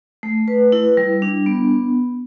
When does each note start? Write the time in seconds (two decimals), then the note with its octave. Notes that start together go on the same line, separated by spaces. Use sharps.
0.23 A3
0.48 B4
0.72 E4
0.97 G3
1.22 D4
1.46 B3